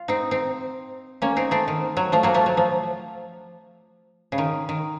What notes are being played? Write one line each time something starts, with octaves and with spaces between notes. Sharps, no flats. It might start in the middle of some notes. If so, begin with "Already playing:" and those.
Already playing: F4
C4 D#4
C4 D#4
A#3 C#4
C4 D#4
A3 C4
D#3
F#3
F3 A3
F#3 A#3
F3 A3
F#3
F3
C#3
D#3
D#3